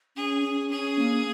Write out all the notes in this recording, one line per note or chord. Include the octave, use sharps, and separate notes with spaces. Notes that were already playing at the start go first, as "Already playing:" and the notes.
C#4 G#4
C#4
C#4 G#4
A#3